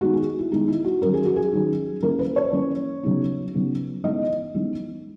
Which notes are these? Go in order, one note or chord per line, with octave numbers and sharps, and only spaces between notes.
D#3 G#3 B3 D#4 F#4
G#4
E4
D#3 G#3 B3 D#4
E4
F#4
D#3 F#3 C#4 A#4
G#4
F#4
G#4
D#3 F#3 C#4
E3 A#3 C#4 A#4
B4
C#5
E3 A#3 C#4
C#3 F#3 B3 D#4
C#3 F#3 B3 D#4
E3 G#3 B3 D#4 D#5
E3 G#3 B3 D#4